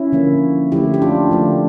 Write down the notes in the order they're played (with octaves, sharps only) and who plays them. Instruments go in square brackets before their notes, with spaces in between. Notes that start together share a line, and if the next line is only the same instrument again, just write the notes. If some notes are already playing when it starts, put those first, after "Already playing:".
Already playing: [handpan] C#4 E4
D3 F3 A#3
D3 F3 A3 E4 G4
G4
D4 F4
D3 F3 A3